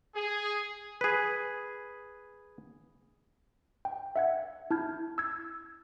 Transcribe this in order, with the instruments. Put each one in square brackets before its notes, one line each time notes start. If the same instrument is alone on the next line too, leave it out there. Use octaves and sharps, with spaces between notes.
[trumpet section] G#4
[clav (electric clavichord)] G#4 B4
[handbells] G5
E5 F#5 G#6
E4 A5 F6 G6 G#6
E6 G#6